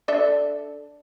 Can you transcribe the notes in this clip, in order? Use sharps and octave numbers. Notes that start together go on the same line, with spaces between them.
D4 A4 E5